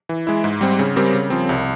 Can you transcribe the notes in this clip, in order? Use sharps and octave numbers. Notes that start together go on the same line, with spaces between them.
E3
G#3 E4
G#2
G3 C4
C#3
G3 C4 G4 A#4
C#3
F3 C4
C2